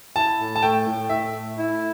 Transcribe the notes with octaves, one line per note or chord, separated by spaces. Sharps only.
E4 A5
A2
A5
A3 G5
A2
A2 E5
A3
E4